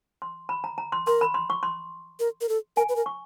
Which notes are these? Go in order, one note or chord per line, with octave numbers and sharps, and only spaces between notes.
C6
B5
A#5
A#5
C6
A#4 C6
B5
C6
C#6
C6
A#4
A#4
A4
A#4 G#5
B4
A#4
C#6